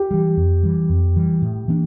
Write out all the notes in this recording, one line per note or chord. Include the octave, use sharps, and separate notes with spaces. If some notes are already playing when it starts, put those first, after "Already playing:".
Already playing: G4
E3 G3
F2
E3 G3
F2
E3 G3
A2
E3 A#3 D4